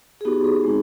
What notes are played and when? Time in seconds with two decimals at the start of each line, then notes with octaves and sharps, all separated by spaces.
0.21 G#4
0.25 B3 D#4 F#4 G4
0.44 G#4
0.64 G#3 C4 D#4